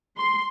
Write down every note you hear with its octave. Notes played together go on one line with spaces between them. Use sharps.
C6